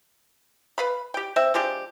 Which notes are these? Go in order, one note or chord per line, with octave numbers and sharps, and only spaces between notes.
B4 F5 B5
G4 G5
C4 E5
F3 G#3 D4 G4